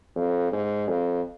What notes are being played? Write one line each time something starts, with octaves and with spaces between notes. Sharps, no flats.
F2
G#2
F2